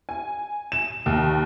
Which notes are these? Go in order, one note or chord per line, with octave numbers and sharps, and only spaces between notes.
G#5
E7
D#2